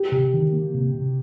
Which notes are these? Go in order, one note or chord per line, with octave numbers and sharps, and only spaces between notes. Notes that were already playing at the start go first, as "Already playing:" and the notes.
Already playing: G4
C3
D#3
A#3
C3
C3